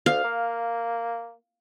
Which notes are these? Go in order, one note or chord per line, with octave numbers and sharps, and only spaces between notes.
D2 F5
A#3